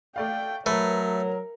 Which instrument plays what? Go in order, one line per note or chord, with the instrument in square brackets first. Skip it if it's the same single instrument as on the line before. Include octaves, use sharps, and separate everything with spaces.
[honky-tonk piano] A3 D5 F5 [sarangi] G5
[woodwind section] F#3 [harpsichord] A3 [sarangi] A#4 [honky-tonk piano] B4